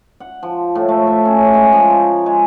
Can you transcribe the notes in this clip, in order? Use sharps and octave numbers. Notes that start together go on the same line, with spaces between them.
F#5
F3
A2
A3
E5
C#4
G#3
F3
A#4
G#3